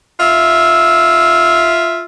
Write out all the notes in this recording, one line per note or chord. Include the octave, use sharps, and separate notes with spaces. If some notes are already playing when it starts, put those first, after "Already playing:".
F4 E5